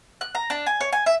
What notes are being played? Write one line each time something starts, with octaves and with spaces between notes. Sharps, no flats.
F#6
A#5
D4
G#5
C#5
G#5
E5